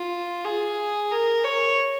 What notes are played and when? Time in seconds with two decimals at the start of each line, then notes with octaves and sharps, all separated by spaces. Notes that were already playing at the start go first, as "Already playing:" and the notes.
Already playing: F4
0.44 G#4
1.11 A#4
1.44 C#5